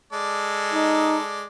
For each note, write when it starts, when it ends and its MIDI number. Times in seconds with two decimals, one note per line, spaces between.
0.13 1.45 56
0.13 1.45 69
0.13 1.45 74
0.73 1.19 63